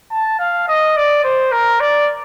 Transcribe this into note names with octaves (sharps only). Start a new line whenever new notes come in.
A5
F5
D#5
D5
C5
A#4
D5